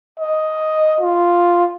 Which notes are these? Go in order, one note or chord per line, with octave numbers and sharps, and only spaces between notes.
D#5
F4